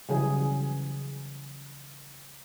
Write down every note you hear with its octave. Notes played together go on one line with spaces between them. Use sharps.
C#3 E3 F#3 G3 G#4